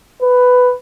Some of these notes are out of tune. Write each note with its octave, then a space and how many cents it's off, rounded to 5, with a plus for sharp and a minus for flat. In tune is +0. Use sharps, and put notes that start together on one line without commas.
B4 +10